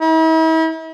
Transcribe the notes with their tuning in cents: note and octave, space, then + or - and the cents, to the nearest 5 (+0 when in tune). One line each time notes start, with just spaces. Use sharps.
E4 -45